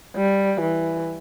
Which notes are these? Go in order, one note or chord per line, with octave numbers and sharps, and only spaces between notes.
G3
E3